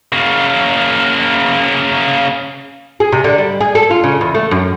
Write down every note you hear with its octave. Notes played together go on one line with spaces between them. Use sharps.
C#3 A#3
G#4
C3
D3
G3
G#4
A4
F4
C#3
E2
A3
F#2